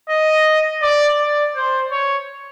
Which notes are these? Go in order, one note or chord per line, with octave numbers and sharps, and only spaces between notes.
D#5
D5
D5
C5
C#5